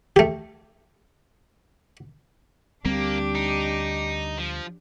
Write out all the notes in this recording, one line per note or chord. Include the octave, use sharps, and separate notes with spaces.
A3 G4
D2 G3 A#3 C4 D4 G4
D#4
F3